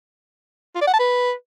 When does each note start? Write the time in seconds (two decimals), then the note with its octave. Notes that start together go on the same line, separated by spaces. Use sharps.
0.75 F4
0.81 D5
0.87 F#5
0.93 A5
0.99 B4